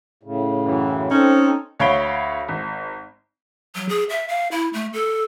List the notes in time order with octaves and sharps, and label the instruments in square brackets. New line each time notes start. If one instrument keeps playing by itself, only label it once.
[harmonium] A2 C#3
[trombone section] F#2 E3
[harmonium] C4 [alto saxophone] C#4 [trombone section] D#4 A4
[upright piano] D2 C#5 F5 B5 D7 G7
G#1
[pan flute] F#3
G#4
E5
F5
E4
A3
A4